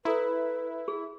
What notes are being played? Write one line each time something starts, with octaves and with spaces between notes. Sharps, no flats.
E4 A4 B4 A#5
G#4